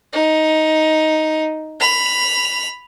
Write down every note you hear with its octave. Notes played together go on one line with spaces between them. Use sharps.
D#4
B5 F7